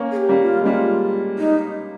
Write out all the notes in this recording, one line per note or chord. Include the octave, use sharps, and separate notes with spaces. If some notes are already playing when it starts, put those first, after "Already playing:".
Already playing: A#3 C#4
G#4
G4
G3 A#3
F4
G#3
G3 A#3 F4
D#4